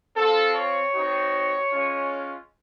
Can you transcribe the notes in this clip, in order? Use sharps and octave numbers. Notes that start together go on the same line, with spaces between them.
C4 F4 A4
C#5
C4 D#4 F#4
G#3 C#4 F4